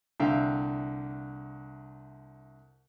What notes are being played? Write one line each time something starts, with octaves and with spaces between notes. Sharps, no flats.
C2 D3 E5 F5 G5